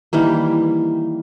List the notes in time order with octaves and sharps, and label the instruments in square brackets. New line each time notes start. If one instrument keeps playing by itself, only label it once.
[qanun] D#3 E3 G3 A#3